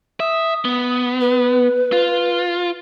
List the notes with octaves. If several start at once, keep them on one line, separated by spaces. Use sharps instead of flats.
E5 D#6
B3
B4
F4